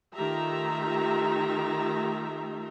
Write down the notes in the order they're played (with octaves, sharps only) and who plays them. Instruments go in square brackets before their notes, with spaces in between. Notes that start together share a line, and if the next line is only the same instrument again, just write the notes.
[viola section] D#3 A3 F4 G4 E5 A#5